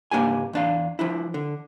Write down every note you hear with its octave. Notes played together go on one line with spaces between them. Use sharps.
C#2 G#2 A#3 D4 G4 G#5
E2 D4 F5
F3 D4 E4
D3